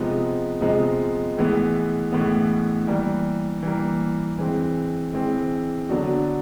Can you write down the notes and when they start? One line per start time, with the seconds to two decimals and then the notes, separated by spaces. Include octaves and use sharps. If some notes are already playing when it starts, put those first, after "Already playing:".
Already playing: C3 F3 G#3 B3 D#4
0.61 C3 F3 G#3 B3 D#4
1.37 A2 E3 G#3 B3
2.12 A2 E3 G#3 B3
2.87 E3 G3 A#3
3.63 E3 G3 A#3
4.38 E3 G#3 C4
5.14 E3 G#3 C4
5.89 D3 F#3 B3 D4 F#4